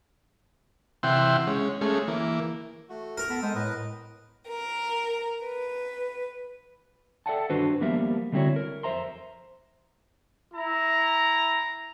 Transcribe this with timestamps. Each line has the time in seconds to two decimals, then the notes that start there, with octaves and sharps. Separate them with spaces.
1.03 C3 E3 E5 F#5 G5 C6
1.47 G#3 C#4
1.81 G#3 A3 C#4 G#4
2.08 E3 A#3
2.89 A3 F#4
3.18 A#4
3.30 B3 A4 B5
3.42 G#3 A4 C5 D#6
3.55 A2 B4 D#5
4.48 A#4
5.44 B4
7.26 A4 D5 E5 F#5 G5 A5
7.50 G2 D#3 D4 F#4 B4 C5
7.80 F3 G3 A#3 B3 A#4 E5
8.32 D3 G3 C4 E4 F#4 C#5
8.56 A#4
8.83 F2 C5 E5 A#5 C6
10.54 E4 A#5